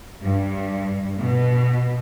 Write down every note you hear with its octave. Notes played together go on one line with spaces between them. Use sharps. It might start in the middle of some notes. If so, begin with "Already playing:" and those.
G2
B2